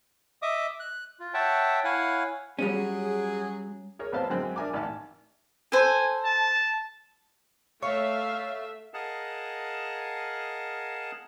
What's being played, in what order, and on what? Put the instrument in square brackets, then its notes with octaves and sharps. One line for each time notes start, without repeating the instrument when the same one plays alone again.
[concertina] D#5 E5 D6 D#6
F#6
F4
C#5 E5 F#5 G5 A5
E4 C#5 F5 F#5 G#5
[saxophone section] F#3 G#4 [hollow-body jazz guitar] G3 C#4
[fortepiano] G#4 A#4 C#5
A1 B3 C4 C5 F5 A5
F#2 D3 G#3 C4 G#5 F#6
D4 A#4 E5 G#5 A#5 D6
A1 D#3 G#5 A5
[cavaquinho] A4 C5 [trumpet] G#5
[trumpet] A5
[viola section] A3 E5 [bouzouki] C#5 [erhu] F5 [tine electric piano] C#6
[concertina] G#4 A#4 D#5 F5 F#5 A5